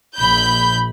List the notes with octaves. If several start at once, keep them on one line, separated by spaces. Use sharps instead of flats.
A#1 B5 G6